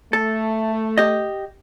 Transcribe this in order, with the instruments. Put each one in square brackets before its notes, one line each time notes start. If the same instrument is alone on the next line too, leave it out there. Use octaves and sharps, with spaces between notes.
[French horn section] A3 [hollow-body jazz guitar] A4
[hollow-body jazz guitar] G4 D#5